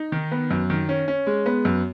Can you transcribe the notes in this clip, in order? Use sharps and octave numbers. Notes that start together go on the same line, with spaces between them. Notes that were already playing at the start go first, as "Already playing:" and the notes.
Already playing: D#4
D#3
B3
F#2
D#3
C#4
C#4
G#3
B3
F#2